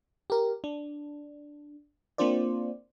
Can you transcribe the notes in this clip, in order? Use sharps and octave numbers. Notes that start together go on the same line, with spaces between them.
G4 A#4
D4
A#3 C4 D4 F4 C5 D5